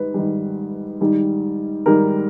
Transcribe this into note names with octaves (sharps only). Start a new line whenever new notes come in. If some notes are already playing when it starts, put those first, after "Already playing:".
Already playing: G#2 D#3 G3 B4
G#2 D#3 G3
G#2 D#3 G3
G#2 D#3 G3 A#4